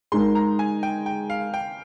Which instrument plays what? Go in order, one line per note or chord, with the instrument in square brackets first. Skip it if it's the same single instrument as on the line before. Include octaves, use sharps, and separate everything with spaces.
[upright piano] G#3 D#4 A#4 [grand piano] C6
[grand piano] A#5
G#5
G5
G5
F5
G5